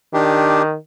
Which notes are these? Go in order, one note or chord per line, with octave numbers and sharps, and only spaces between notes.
D#3 D4 G4